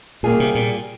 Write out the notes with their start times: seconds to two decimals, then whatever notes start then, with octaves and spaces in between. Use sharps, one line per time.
0.23 A#2 G3 A#3 F4 G#4
0.40 C3
0.55 A#2